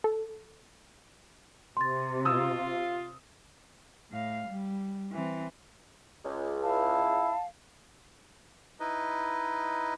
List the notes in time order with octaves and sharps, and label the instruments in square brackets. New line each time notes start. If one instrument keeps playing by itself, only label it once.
[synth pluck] A4
[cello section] C3 [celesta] C6 A6
[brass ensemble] F4 [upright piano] D#6 E6
[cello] A2 F5
G3
E3 C4
[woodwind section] C#2
[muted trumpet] E4 [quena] F5 [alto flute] A5
[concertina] D#4 E4 B4 D#5